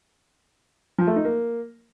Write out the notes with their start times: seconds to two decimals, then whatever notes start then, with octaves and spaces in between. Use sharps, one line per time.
0.98 F3
1.07 A3
1.16 D#4
1.25 A#3